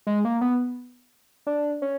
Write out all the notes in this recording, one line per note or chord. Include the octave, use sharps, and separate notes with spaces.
G#3
A#3
B3
D4
C#4